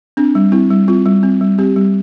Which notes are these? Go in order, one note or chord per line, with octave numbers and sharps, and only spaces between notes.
C4 D4
G3
C4 E4
G3
C4 F4
G3
C4
G3
C4 G4
G3